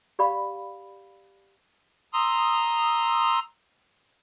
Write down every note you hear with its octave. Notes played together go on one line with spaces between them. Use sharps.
G4 D5 F5 B5
A#5 C6 D#6 E6